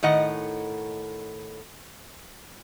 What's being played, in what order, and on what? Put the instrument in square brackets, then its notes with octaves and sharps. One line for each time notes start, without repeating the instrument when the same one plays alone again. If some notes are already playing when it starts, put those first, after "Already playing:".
[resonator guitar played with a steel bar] A2 D#3 D#5 F#5